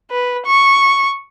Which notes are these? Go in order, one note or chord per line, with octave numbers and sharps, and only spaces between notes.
B4
C#6